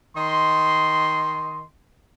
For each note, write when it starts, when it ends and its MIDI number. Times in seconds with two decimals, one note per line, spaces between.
0.17 1.63 51
0.17 1.63 75
0.17 1.63 84